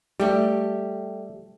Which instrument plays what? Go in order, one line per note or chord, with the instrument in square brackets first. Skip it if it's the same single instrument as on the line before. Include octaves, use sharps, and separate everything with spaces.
[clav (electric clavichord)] G3 [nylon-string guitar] A3 G4